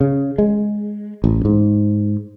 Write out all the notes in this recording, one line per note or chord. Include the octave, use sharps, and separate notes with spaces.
C#3
G#3
A1
G#2